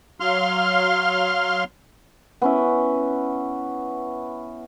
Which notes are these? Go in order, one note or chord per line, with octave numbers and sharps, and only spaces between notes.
F#3 F5 C6 F6
B3 C#4 E4